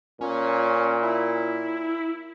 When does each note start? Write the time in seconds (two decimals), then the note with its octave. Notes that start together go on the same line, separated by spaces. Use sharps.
0.21 A#2 C#4
1.03 E4